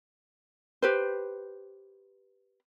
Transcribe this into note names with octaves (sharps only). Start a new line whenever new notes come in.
G4 B4 C5